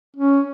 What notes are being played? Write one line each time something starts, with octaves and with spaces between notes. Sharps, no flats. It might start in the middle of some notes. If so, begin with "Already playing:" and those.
C#4